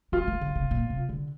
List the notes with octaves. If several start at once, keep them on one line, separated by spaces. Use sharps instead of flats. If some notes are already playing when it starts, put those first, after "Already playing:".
F3 F4
D#3
D3
C3
A#2
C3
D3